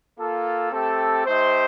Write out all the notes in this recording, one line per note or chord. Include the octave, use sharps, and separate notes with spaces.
A#3 F4 A4
A3 C4 G4 A4
A3 D#4 G4 C5